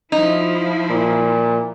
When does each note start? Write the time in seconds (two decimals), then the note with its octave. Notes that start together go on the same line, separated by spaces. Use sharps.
0.12 F3 D#4 E4
0.90 A#2